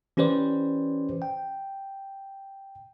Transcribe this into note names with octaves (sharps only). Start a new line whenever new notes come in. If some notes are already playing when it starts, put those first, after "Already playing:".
E3 C#4 G4 B4 C5 D5
G5